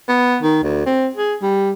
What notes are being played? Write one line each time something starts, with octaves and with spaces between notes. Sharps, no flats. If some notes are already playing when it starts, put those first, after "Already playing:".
B3
D#3
D2
C4
G#4
G3